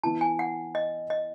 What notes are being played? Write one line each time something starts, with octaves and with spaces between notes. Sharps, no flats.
E3 B3 E4 A5
G#5
F#5
D#5
D#5